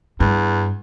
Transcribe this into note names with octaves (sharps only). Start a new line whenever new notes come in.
E2 G2